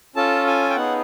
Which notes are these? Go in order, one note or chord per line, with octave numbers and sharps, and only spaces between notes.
C#4 F4 A4 A5
G#5
G5
B3 D#4 G#4 F#5